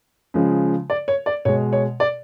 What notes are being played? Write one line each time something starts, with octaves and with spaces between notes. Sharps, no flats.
C#3 F3 G#3
D5
C#5
D5
B2 G#3 C#5
C#5
D5